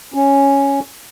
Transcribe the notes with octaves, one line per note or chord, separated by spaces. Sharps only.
C#4